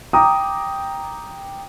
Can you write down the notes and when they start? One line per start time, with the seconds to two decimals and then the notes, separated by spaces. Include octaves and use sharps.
0.13 G5 A#5 D6 D#6